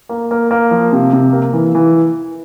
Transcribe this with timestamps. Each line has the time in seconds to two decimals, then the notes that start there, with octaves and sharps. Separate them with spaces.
0.09 A#3
0.31 A#3
0.51 A#3
0.71 F3
0.93 C3
1.13 C3
1.33 A#3
1.53 E3
1.75 E3